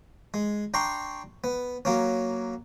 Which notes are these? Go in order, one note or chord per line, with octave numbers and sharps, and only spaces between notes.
G#3
D4 G5 A#5 C6 C#6
B3
F#3 A#3 C#4